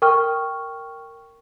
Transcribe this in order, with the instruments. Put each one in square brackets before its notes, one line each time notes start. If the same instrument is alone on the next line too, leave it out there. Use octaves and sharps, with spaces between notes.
[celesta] A#4 G5 C#6 F6